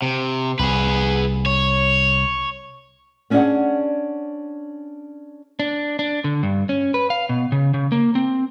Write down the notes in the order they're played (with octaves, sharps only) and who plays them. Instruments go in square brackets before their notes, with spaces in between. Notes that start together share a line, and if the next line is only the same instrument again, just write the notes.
[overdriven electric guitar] C3
[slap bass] C2 [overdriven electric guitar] G#4 B4
[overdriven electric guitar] C#5
[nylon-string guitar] B3 C#4 D4 G#4 D5 F#5
[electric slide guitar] D4
D4
D3
G2
C#4
B4
F5
B2
C#3
C#3
A#3
C4